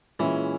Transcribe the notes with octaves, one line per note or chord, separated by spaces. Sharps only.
A#2 E3 G#3 C#4 E4